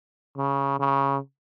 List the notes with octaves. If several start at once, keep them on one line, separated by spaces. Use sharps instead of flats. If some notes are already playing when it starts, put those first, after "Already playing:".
C#3
C#3